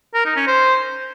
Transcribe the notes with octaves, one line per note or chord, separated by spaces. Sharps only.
A#4
D#4
C#4
C5